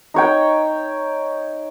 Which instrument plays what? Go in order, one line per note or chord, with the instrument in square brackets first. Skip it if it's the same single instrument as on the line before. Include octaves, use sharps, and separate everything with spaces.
[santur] D#4 C#5 G5